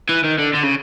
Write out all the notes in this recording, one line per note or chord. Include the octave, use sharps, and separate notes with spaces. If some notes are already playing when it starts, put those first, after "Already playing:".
E3
D#3
D3
D3
C#3